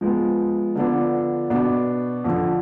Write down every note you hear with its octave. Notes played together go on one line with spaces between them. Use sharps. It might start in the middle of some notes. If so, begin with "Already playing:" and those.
F3 G#3 B3
D3 F3 B3 D4
B2 B3 D4
F2 D3 F3